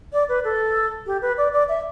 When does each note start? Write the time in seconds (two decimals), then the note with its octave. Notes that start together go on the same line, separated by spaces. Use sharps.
0.13 D5
0.29 B4
0.44 A4
1.07 G4
1.22 B4
1.37 D5
1.53 D5
1.69 E5